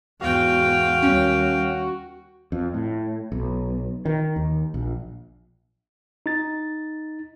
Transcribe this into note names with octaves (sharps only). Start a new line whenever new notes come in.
E2 G#2 F#4 F5 G5
D#2 G3 C#4
F2
A2
B1
D#3
D#2
A#1
D#4 A6